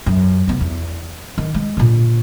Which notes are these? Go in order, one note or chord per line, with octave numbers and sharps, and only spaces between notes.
F#2
C2 B3
E2
D#3
G#3
A#2 D3